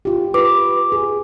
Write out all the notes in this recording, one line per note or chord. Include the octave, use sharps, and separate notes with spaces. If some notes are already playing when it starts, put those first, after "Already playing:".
F4 G4
B4 D6
G#4